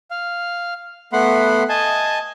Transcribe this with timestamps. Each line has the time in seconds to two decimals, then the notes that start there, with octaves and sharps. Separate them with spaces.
0.11 F5
1.13 A3 B3 F#5 B5 C6
1.69 D#5 G#5 A5